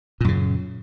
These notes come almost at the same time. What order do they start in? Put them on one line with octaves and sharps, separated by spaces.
A#2 F#2 C#3